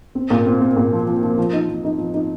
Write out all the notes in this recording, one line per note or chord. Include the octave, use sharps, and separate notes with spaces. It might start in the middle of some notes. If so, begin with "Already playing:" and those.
C4
A#2
C4
C4
A#2
F3
F3
F3
F3
D#4
F3
D#4
F3
D#4